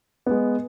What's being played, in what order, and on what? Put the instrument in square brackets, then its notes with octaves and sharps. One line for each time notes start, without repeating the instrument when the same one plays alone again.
[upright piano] G#3 B3